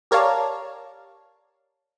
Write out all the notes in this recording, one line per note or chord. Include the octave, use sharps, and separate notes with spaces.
G4 A#4 C#5 D5 F5 A5